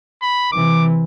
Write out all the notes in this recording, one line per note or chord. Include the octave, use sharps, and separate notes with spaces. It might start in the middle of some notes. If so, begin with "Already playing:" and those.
B5
C3 E3 D6